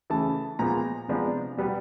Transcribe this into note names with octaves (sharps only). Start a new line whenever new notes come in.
C#3 E3 A3 A5
A#2 F3 G#3 B3 A#5
C3 F3 G#3 B3 D4
B2 G3 B3